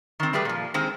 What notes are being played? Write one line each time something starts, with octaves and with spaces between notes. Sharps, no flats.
D#3 C4
G3 A3 G4 G#4 B4
A#2 F3
D#3 G#3 C4